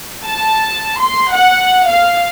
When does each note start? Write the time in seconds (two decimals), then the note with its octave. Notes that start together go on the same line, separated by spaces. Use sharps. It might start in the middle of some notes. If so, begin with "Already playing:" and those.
0.25 A5
1.00 C6
1.33 F#5
1.87 F5